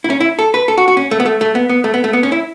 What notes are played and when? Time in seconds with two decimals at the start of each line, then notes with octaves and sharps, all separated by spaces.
0.04 E4
0.10 C#4
0.20 E4
0.39 A4
0.54 B4
0.68 A4
0.78 F#4
0.88 F#4
0.97 C#4
1.11 A3
1.20 B3
1.26 A3
1.41 A3
1.55 B3
1.69 B3
1.84 A3
1.94 B3
2.04 A3
2.13 B3
2.23 C#4
2.32 E4